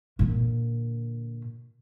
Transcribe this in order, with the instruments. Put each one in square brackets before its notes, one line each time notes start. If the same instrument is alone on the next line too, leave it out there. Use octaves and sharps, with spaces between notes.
[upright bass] A#2 D3